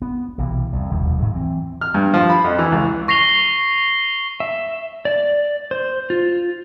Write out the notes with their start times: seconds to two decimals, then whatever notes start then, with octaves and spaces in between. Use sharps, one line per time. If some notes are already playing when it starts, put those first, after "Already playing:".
0.02 B3
0.38 B1 C3 E3
0.73 C2 F2
0.90 F1 D#2 B2 G3
1.19 G#2 F#3
1.35 E3 C4
1.81 F6
1.94 G2
2.14 F3
2.29 B5
2.44 F2
2.59 E3
2.72 C#2
3.08 C#6 A#6 C7 F7 G7
4.40 E5
5.05 D5
5.71 C5
6.10 F4